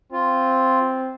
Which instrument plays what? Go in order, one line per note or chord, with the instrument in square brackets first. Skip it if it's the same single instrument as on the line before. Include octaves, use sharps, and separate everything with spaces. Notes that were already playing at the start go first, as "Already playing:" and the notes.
[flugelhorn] C4 [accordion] F4